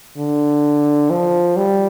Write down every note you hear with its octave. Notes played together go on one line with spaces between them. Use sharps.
D3
F3
G3